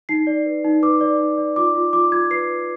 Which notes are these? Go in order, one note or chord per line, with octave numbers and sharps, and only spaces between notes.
D#4 C7
D5
B4
D#4
B4 D6
D5
D#4
D5
F4 D6
F4
F4 D6
F4 G#6
B4 C7
B4